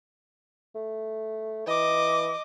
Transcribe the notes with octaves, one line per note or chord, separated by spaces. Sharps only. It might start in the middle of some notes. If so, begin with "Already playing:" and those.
A3
E3 D#5 D6